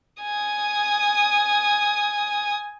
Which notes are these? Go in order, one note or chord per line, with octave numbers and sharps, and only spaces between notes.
G#5 D#6